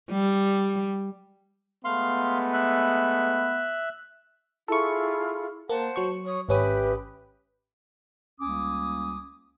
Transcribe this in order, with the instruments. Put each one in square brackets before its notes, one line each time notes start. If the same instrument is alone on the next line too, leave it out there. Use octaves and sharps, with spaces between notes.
[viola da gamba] G3
[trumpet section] G#3 A3 B3 [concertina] F5 C6
[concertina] E5 F#6
[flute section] E4 F4 G#4 [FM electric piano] A4 C#6
[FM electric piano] A#3 [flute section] C5 F#5 A5
[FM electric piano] F#3 C#6
[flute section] C#5 D#6
[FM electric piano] G#1 C#4 D#6 [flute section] G4 B4 E5
[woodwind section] C#2 G3 A#3 C#4 D6 D#6